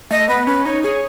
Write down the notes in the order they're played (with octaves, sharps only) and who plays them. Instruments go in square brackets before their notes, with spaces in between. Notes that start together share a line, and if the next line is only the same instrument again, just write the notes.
[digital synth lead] A3 [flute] D#5
[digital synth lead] B3 [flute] B4
[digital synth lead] C#4 [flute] B4
[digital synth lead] D#4 [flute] C#5
[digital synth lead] G#4 [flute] C#5